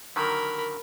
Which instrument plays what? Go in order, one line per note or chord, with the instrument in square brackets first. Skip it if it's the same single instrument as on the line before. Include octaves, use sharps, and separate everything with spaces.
[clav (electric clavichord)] D3 D#3 F#3 [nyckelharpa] A#4 B5